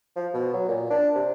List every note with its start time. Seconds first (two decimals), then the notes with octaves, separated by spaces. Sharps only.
0.16 F3
0.34 B2
0.54 F#3
0.68 A#2
0.90 D4
1.15 C3